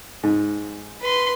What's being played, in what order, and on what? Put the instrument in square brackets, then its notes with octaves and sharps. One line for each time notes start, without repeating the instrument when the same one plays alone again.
[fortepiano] G#2
[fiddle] B4 C6